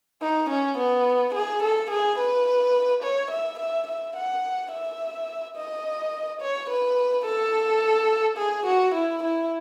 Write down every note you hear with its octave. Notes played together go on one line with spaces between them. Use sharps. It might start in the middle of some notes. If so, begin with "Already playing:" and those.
D#4
C#4
B3
G#4
A4
G#4
B4
C#5
E5
E5
E5
F#5
E5
D#5
C#5
B4
A4
G#4
F#4
E4
E4